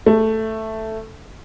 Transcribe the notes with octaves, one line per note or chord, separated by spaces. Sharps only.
A3